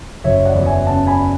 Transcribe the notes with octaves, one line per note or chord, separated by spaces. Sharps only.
F#1 C#5 E5
D5 F#5
E2
E5 G#5
C#3 F#5 A5
G#5 B5